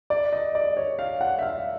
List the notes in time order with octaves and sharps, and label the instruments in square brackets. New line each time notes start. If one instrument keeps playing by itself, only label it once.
[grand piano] D5
D#5
D5
C#5
F5
F#5
E5
F5